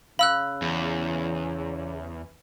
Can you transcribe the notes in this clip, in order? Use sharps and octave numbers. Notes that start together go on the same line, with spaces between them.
C#3 F5 B5 E6 F#6
E2